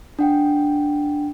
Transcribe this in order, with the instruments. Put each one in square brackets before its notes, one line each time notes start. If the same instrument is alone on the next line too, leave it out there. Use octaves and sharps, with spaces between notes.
[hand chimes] D4 F#5 G5